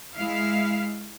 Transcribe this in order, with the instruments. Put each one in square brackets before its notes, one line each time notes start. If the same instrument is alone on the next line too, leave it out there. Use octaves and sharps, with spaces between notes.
[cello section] G#3 E4 F5